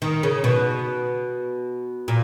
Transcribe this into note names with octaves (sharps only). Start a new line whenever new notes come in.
D#3
C#3
B2
A#2